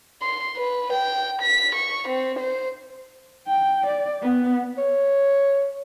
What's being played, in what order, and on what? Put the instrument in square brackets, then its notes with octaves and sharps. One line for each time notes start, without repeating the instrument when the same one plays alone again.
[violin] C6
B4
G5
B6
C#6
C4
C5
[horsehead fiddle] G5
D5
B3
[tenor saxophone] C#5